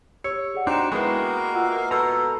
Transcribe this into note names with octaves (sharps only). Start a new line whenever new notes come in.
G4 C#5 E6 C#7
G#4 D5 F#5
D4 D#4 F#4 C5 G5 D7 E7
G#3 A#3 B3 E4 F#4 G5 B5 C7
F4 F#5 E6
B2 A4 A5 A#5 E6 F6